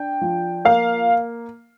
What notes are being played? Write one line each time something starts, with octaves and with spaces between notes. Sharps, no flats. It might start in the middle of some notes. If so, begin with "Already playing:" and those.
Already playing: D4 G5
F3
A#3 F5